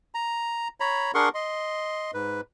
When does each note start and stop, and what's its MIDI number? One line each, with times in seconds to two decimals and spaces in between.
0.15 0.68 82
0.80 1.12 73
0.80 1.12 82
0.80 1.12 83
1.15 1.29 62
1.15 1.29 68
1.15 1.29 70
1.15 1.29 78
1.15 1.29 84
1.15 1.29 85
1.35 2.11 75
1.35 2.11 84
2.14 2.41 44
2.14 2.41 71